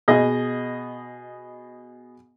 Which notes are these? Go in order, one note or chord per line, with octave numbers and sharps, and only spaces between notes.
B2 G#4 D#5